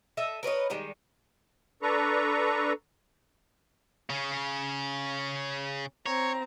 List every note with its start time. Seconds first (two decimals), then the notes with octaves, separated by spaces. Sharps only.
0.17 A4 D#5 E5
0.43 A#4 B4 C#5 D#5
0.70 D#3 G3 G#3
1.82 D4 A4 B4 A#5 C#6
4.10 C#3 C#4
6.06 C4 C#5 A#5